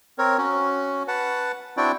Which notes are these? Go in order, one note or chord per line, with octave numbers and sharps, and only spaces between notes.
C4 A#4 C#5
C#4 F#4
B4 F#5 A5
C4 D4 E4 F#4 D5 G5